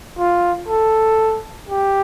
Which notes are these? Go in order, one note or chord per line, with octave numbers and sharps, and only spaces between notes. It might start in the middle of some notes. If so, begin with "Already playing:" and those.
F4
A4
G4